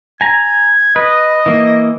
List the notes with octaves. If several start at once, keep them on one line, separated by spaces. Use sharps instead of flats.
G#5 A#5 G#6
B4 D#5
E3 A#3